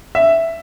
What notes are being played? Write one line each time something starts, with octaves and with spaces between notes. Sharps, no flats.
E5